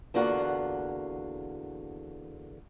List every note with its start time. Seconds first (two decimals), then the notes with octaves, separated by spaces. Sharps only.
0.14 E2 D3 A#3 F4 F#4 F#5